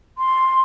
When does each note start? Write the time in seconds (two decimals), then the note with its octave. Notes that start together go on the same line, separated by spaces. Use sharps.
0.18 C6